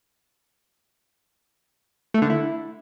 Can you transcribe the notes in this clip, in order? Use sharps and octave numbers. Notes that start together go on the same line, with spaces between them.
A3
D3
E4